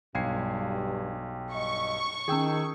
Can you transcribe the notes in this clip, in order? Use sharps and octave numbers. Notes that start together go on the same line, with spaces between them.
B1 G2 F5 G5 G#6 C7
G2 D#5 C#6
D#3 C#4 G#4 G5 D#6 E6